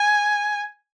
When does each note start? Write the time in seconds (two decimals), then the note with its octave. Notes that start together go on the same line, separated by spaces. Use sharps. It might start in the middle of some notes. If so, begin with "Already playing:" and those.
Already playing: G#5